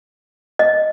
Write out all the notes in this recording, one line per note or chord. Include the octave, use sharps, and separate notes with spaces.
D#5